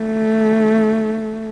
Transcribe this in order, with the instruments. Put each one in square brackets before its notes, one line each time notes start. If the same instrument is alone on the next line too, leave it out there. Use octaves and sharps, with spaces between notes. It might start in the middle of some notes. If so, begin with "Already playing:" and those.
Already playing: [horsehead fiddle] A3